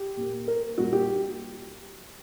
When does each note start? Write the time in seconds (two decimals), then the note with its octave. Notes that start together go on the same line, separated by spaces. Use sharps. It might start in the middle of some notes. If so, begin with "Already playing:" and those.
Already playing: G4
0.17 A#2 A#3
0.48 A#4
0.78 A#2 G3 A#3 F#4
0.93 G4